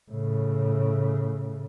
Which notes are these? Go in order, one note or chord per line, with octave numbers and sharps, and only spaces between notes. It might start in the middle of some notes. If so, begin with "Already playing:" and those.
A2 C#3